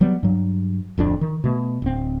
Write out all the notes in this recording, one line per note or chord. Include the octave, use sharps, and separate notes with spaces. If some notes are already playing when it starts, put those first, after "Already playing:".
F#3 G3 B3
G2 F#3
D1 F2 D4
D#3
B2 A3
D1 C4